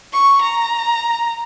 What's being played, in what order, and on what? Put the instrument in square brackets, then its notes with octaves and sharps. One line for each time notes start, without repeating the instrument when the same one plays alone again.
[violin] C#6
A#5